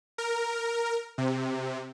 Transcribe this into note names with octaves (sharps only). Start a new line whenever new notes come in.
A#4
C3